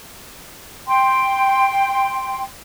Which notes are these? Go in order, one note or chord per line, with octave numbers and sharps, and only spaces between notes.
G5 C6